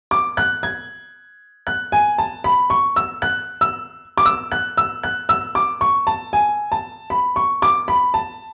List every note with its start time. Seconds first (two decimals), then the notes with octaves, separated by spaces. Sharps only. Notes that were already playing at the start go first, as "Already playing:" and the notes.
0.11 D6
0.37 F#6
0.63 G#6
1.67 F#6
1.92 G#5
2.18 A5
2.44 B5
2.70 C#6
2.96 E6
3.22 F#6
3.61 E6
4.17 D6
4.26 E6
4.52 F#6
4.77 E6
5.03 F#6
5.29 E6
5.55 D6
5.81 C#6
6.07 A5
6.33 G#5
6.72 A5
7.10 B5
7.36 C#6
7.62 D6
7.88 B5
8.14 A5